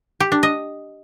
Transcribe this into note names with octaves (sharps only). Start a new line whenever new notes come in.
G4
D4
D#5